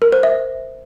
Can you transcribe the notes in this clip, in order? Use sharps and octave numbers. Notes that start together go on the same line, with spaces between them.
A#4
C5
E5